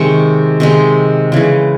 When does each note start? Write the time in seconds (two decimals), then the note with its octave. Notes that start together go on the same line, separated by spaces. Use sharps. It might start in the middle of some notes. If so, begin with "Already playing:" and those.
Already playing: C3 D#3 G#3 C#6
0.60 C3 D#3 G#3
1.32 C#3 E3 G#3